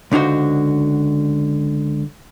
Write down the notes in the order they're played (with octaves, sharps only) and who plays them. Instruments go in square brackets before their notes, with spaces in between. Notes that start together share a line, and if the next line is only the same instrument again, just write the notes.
[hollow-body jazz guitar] C#2 D3 D#4 F#4 C5